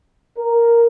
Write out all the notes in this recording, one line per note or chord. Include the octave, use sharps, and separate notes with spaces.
A#4